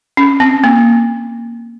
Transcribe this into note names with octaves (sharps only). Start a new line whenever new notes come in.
C#4
C4
A#3